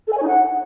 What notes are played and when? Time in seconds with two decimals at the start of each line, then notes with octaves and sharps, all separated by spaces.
0.07 A4
0.12 G#5
0.17 C#5
0.23 D#4
0.28 F#5